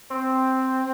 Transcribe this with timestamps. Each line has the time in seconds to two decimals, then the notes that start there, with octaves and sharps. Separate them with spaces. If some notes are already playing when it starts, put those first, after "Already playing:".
0.10 C4